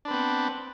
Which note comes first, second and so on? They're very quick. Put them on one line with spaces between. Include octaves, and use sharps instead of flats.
D4 B4 C4 B3